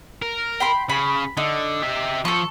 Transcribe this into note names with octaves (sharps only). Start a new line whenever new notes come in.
A#4
G5 B5 C6
C#3 B5
D3 D#4
G4 E5
F3 A4 C#6